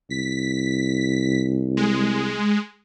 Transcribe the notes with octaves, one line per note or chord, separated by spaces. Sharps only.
C2 B6
G#3